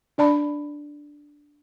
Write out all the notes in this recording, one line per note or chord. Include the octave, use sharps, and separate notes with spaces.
D4 D5 A5 B5